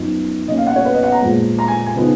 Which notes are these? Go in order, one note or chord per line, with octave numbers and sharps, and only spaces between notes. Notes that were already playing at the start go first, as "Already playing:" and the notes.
Already playing: F#2 F3 B3 D#4
B2 A#3 C#4 D#5
F5
F#5
C#5
B4
D#5
F#5
A#5
A#2 F3 G#3
A#5
G#5
G#5
C#3 F3 B3 D#4